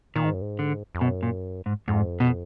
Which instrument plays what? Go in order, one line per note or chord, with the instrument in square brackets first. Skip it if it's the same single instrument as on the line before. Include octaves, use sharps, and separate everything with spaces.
[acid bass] A#2 [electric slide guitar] D#3
[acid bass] G#2
F#2
G#2
[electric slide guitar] D3
[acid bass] F2
[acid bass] F#2 [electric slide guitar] B2
[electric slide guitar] A#2
G#2
[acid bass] F2 [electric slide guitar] G#2
[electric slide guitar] B2